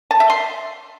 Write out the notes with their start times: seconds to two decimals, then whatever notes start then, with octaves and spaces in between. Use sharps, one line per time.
0.11 A5
0.20 E5
0.30 C6